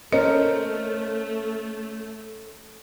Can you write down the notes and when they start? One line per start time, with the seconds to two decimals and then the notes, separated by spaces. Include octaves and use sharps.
0.13 A3 C#4 A#4 C5 D#5